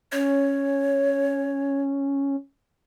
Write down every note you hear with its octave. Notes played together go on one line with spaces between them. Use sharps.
C#4 C#5